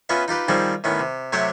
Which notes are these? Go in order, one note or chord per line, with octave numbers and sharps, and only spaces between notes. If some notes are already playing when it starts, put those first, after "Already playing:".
B3 C#4 F4 B4 D#5 E5
D#4 F4 G4 B4
D#3 F3 G3 C4 D#4 G#4
A2 D#3 B3 C#4
C3
C3 F#3 A3 G4 C5 C#5